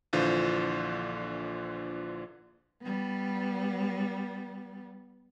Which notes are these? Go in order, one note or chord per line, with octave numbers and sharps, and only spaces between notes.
A#1 D3 E3 F4 C5
G3 B3